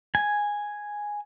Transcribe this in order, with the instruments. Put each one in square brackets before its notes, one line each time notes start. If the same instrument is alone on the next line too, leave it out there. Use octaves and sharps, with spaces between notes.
[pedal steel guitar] G#5